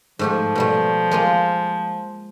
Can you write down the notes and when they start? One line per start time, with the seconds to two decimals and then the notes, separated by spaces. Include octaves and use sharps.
0.19 G#2 F3 A3 G4
0.55 B2 G3 A3
1.11 G#3 A#3 F4